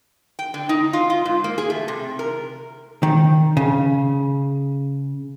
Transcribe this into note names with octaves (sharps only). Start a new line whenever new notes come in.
G5
D3
D#4
F4
F4
G#2
A#3
G#4
A3
C3
A#4
D#3
C#3